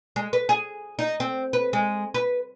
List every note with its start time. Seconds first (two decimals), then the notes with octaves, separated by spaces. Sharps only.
0.16 G#3
0.33 B4
0.49 G#4
0.99 D#4
1.20 C4
1.53 B4
1.73 G#3
2.14 B4